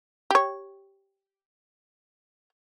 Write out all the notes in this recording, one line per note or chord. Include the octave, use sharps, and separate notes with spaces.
G4 C#5